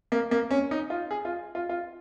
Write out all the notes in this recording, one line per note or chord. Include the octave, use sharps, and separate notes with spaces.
A#3
A#3
C#4
D#4
F4
G#4
F4
F4
F4